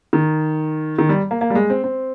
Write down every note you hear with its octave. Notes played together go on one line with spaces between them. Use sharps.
D#3
D#3
G3
A#3
A#3
G3
G#3
C4
C4